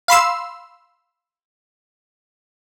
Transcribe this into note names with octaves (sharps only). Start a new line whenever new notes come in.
F5 B5 C6 E6